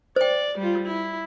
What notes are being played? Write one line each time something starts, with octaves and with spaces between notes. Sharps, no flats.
C5 D5 G5
G3 F4
E4